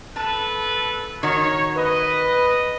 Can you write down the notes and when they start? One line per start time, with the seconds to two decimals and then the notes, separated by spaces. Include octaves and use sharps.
0.16 A4 B4 A5
1.23 D#3 F#4 C#5
1.77 B4 D#5